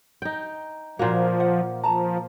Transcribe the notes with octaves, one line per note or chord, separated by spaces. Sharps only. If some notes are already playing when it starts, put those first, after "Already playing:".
D#4 G5
A#2 F3 A#3 F#4 A#4 C5
F#5
F3 A5 A#5